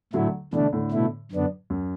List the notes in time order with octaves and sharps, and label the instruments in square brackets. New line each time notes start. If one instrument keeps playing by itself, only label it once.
[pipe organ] A2 A3 E4 [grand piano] D3 F#3
[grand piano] B2 E3 [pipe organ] D3 A3 D4
[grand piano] A2 D3
[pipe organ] B2 A3 E4
F#2 D3 B3 D4
[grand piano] F#2